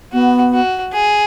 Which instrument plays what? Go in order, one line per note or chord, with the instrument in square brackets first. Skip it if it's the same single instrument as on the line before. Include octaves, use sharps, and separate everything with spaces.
[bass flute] B3 [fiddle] F#4
[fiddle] F#4
G#4